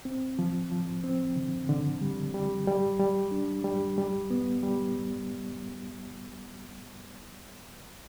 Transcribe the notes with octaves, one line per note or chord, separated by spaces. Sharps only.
C4
F3
F3
C4
D3
D3
G3
G3
G3
G3
D4
G3
G3
B3
G3